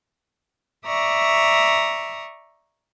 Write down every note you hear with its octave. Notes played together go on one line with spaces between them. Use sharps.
D5 E5 A#5 C#6 D#6